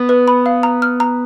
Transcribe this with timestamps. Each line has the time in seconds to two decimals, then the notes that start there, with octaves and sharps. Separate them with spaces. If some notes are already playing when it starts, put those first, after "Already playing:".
Already playing: B3
0.09 B4
0.28 B5
0.46 F5
0.63 A#5
0.82 F6
1.00 A#5